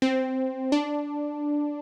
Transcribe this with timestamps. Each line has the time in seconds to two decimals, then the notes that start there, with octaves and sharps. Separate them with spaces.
0.02 C4
0.72 D4